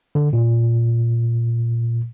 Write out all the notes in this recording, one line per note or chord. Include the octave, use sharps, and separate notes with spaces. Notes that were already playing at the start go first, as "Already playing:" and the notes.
D3
A#2